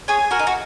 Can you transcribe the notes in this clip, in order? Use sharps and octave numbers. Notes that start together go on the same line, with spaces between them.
G#4 C#5 G#5
F#4 A#4
D#4
F#4